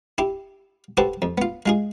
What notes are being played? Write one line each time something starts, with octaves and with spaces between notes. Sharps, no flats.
E4 G4
F#4 G4 A4 B4 C5
F2
B3 F4
G#3 F4 G#4